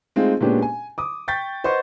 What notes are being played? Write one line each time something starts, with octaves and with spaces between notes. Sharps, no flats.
G#3 A3 C4 D#4 F4 G#4
A#2 G#3 B3 C#4 D4 G4
G#5
D6 D#6
G5 C#6 G6 A6 B6
B4 C5 D#5 F#5 C6 C#6